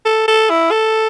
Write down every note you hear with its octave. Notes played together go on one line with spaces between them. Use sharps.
A4
A4
E4
A4